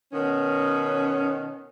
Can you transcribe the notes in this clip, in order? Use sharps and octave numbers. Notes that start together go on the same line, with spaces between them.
B2 D#3 C#4